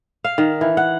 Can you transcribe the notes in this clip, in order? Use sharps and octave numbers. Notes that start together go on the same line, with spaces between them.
F5
D#3
E3
F#5